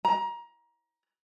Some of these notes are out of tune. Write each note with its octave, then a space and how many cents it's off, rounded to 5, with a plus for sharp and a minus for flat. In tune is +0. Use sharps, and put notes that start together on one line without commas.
A#5 +25